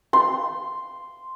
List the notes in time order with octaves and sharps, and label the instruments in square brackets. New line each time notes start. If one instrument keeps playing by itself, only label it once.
[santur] C6